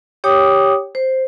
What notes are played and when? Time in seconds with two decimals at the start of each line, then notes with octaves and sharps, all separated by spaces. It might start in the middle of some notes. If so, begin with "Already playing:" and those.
0.24 G4 C#5 G5 D6 D#6
0.95 C5